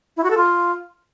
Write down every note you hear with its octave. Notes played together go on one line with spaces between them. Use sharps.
E4
F#4
A4
F4